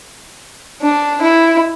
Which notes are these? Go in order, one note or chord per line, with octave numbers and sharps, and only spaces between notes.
D4
E4